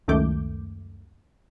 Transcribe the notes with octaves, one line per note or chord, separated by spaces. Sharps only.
C#2 F#2 D#3 A3 D6 G6